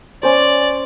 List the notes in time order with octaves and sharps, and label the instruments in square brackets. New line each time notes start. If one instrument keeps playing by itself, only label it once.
[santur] C#4 C5 [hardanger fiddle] D5